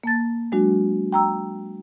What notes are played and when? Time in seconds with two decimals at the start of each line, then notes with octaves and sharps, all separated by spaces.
0.04 A#3 A5 A6
0.52 F#3 G#3 D4 F#4
1.12 G5 A#5 E6